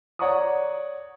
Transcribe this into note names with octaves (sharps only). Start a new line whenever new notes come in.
C#5 D5 F#5 A#5 C#6 D#6